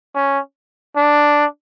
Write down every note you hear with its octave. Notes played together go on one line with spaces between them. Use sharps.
C#4
D4